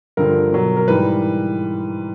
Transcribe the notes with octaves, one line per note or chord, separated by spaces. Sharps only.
G2 D3 F3 A#4
B2 F#3
A#4
G#2 E3 G3 B4